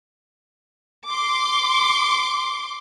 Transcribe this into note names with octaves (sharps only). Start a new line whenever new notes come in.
C6 D6